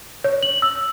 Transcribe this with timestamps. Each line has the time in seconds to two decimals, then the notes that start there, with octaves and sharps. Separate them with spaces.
0.24 C#5
0.43 F#7
0.62 E6